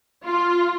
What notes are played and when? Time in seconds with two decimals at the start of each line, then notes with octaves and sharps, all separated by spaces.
0.24 F4